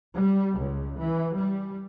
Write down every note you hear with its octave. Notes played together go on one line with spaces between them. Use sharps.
G3
C#2
E3
G3